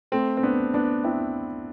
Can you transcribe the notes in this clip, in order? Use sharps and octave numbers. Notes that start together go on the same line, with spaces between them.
A3 C4
C4
B3 D4
B3 D4
C4 E4